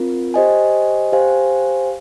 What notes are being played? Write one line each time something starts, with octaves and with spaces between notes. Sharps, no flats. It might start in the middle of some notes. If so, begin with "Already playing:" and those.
Already playing: C4 F4 A#4
G4 C5 D#5 G#5
G4 C5 F5 G#5